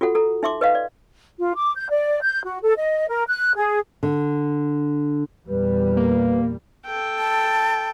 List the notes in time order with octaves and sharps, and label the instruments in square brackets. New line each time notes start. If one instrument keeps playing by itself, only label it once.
[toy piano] F4 F#4 A4 F#5
A4 A#5
D#4 E5 C6 D6
B4 D#5 F5
D5
[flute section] F4
D6
G6
D5
G6
F#4
A4
D#5
A#4
F#6
G#4
[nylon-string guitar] D3
[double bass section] E2 A#2 G3 [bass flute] B4
[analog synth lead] A#3
[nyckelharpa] A4 G5
[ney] A5